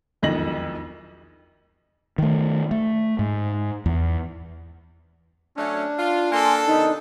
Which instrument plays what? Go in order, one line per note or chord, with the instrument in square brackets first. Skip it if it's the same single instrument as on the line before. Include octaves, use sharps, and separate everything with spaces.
[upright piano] E1 B1 F2 D#3 A#6 F#7
[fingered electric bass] D#3 A3
A3
G#2
E2
[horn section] F#3 A3 C#4 [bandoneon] D4
[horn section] F4
[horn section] A#3 C6 [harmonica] A4 [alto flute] G#5
[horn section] C3 D#3 B3 [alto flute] D#4